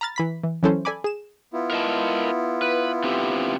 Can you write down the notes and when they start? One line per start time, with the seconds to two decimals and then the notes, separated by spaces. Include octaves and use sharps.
0.01 A#5 B5 F6 A6
0.16 E3 B5 B6
0.43 E3
0.63 E3 F#3 C#4 E4 A4 C5
0.85 A4 D5 G#5 B5 D6
1.04 G#4 E7
1.53 B3 E4 F4
1.70 A#4 D#5 A5
2.62 B4
3.03 D3 C4 G4